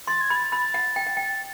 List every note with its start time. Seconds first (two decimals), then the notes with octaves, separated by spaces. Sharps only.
0.07 C6 A6
0.21 G#6
0.30 B5
0.36 A6
0.52 B5
0.74 F#5
0.96 G5
1.07 F#5
1.17 G5